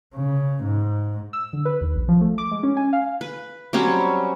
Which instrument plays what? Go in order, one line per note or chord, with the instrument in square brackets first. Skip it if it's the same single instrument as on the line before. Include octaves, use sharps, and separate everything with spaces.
[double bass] C#3
G#2
[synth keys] E6
D3
B4
D#2
A#1
F3
A3
D6
G#3
C#4
G#5
F5
[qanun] B4
F#3 G3 C4 C#4